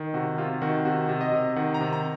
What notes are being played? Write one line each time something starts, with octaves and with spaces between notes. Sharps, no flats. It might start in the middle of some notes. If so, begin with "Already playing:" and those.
Already playing: D#3
C3 F#4
C3 F4
D#3 F#4
C3 F#4
C3
D#5
C3
D#3 F#5
A#5
C3
A#5